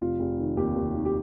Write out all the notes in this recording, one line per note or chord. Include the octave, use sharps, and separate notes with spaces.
F1 F4
F1
D#3
D#2 G4
D#2
D#3
G4